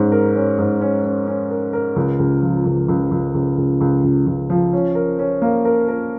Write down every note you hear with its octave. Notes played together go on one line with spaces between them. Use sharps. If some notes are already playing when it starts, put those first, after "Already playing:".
Already playing: G#2 G#3 C#4
A#4
C#4
G#2
C#4
C#4
C#4
A#4
A#4
C#2
C#2
F3
C#2
C#2
C#2
C#2
C#2
C#2
C#2
C#2
F3
C#4
A#4
C#4
A#3
A#4
A#4